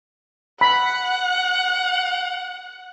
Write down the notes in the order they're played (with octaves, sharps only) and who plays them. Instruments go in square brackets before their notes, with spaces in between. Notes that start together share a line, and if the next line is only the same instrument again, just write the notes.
[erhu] F#5 [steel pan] B5